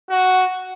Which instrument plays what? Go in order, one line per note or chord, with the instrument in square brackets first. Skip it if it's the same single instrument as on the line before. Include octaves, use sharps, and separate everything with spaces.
[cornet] F#4